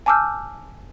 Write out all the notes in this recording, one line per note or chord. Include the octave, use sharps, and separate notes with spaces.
G#5 A5 D6 E6 F6 G6